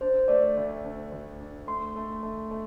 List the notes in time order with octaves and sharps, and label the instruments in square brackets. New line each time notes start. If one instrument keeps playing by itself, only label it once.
[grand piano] D4 [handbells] C5
[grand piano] A3 [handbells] D5
[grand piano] D2
D4
D2
D4
[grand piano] A3 [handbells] C6
[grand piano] A3
A3
A3